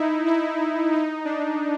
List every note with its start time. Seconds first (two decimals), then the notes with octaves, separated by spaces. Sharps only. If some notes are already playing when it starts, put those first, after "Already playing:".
Already playing: D#4 E4
0.26 E4
0.93 D#4
1.25 D4